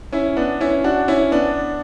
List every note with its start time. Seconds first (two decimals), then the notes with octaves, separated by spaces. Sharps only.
0.13 C#4 E4
0.36 B3 D4
0.61 C#4 E4
0.84 D4 F#4
1.08 C#4 E4
1.31 B3 D4